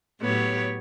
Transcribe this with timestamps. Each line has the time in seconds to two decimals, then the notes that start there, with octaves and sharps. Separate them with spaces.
0.21 A2 F#3 B3 G4 C#5